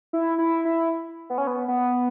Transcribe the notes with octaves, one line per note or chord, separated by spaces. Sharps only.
E4
E4
E4
B3
C#4
B3
B3